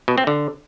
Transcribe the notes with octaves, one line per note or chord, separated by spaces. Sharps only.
B2
C4
D3